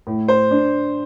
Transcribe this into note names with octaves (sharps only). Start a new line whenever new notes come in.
A2
C5
D4